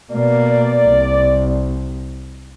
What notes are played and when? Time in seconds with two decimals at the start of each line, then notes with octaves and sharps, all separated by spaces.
0.11 B2 A#3 D5
0.89 C2